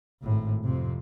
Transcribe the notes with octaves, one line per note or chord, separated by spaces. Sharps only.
G#1 A2
F2 C3